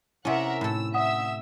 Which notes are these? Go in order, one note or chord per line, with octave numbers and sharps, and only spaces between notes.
C3 C#4 E4 A#4 E5 F#5
A2 A4 E6
E5 F#5 D#6 E6 E7